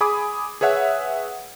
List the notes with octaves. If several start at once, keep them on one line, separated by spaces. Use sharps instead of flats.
G#4 G#5 B5 D6 D#6
G#4 B4 C#5 E5 F#5